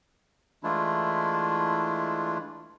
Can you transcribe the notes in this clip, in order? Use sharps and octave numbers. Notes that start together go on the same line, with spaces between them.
E3 G#3 A3 D4 E4 F4